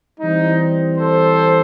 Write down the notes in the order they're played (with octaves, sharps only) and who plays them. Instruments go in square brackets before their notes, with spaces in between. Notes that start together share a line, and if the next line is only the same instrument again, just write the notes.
[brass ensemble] E3 G3 C4 D#4
A4 C5